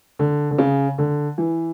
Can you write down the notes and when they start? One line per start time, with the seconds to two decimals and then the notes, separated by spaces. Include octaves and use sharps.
0.19 D3
0.51 D3
0.59 C#3
0.98 D3
1.38 E3